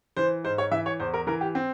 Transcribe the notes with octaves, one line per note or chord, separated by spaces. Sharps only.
E3 C5
G#2 C5
C#5
E3 E5
C#5
E2 C5
A#4
E3 A#4
G4
C4